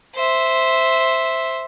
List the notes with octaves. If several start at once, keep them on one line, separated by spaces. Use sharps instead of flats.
C5 E5